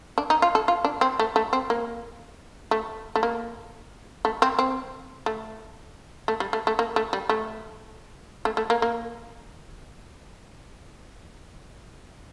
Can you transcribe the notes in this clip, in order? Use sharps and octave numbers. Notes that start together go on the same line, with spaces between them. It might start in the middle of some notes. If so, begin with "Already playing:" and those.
D4
D#4
F4
A4
F4
D4
C4
A3
A3
C4
A#3
A3
A3
A#3
A3
C4
C4
A3
A3
G3
A3
A3
A#3
A3
G3
A3
A3
A3
A#3
A#3